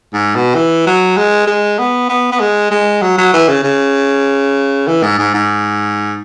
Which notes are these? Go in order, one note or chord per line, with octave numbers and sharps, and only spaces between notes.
G#2
B2
E3
F#3
G#3
G#3
B3
B3
B3
G#3
G#3
F#3
F#3
E3
C#3
C#3
E3
G#2
G#2
G#2